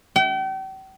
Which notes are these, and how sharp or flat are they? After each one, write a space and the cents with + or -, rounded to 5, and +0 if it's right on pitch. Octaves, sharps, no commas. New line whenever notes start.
G5 -40